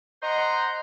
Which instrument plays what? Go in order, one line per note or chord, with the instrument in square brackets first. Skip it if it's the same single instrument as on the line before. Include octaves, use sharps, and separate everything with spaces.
[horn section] C5 D#5 F#5 A#5 C6